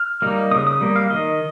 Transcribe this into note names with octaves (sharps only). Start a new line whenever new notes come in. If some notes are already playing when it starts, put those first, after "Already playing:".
Already playing: F6
G3 A#3 D#4
C#3 D#6
D#6
G3 A#3
F5
D#3 D#5